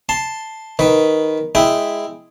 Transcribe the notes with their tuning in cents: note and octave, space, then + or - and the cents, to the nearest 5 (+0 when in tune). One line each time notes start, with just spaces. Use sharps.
A5 +0 C6 +0
D#3 +5 B4 +0
G#3 +0 E4 +0 G5 +0